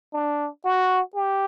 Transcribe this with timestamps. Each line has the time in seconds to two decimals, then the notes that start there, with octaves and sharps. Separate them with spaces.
0.13 D4
0.65 F#4
1.16 G4